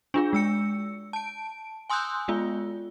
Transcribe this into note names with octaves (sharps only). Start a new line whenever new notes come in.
D4 F4 G#4
G#3 E6 C#7
A5 D7
G#5 C6 D#6 E6 F#6 G6
G#3 B3 F4